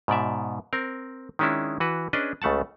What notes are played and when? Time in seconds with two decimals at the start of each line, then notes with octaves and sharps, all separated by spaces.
0.08 G#2 B2 D5 E5
0.73 C4 A#4
1.39 D#3 G#3 C#4 D4 E4
1.80 E3 F#4 B4
2.13 C#4 D4 G#4 B4 D#5
2.42 C#2 C#3 A3 F#5 A5